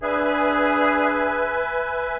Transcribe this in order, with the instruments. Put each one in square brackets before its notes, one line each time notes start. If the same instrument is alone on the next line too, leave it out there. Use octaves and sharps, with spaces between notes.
[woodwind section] D4 G#4 [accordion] B4 E5 G#5